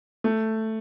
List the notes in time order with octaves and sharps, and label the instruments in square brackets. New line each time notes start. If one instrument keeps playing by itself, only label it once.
[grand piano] A3